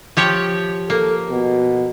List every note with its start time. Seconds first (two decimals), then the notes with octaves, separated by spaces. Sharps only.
0.17 F3 G4 C#5
0.90 A#3 A4
1.30 B2